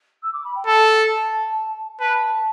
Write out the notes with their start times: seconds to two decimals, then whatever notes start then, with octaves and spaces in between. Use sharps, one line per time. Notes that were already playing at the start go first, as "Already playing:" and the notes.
0.23 E6
0.33 D6
0.44 B5
0.56 G5
0.67 A4 A5
2.00 B4 A5